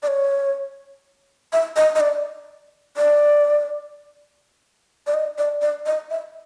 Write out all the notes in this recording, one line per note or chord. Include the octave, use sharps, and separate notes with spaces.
D5
C#5
E5
D#5
D#5
D5
D5
D5
D#5
D5
D5
D#5
E5